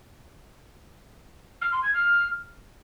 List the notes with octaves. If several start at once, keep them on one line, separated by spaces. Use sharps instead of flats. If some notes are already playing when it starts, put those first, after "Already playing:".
F6
C6
G#6
F6